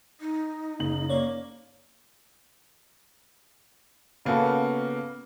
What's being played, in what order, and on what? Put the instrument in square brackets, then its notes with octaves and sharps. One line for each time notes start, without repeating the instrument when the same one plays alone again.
[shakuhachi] D#4
[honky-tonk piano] F#1 F#7
[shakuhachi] A#3 [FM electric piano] C#5 D5
[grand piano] C#3 A#3 B3 F#4 A4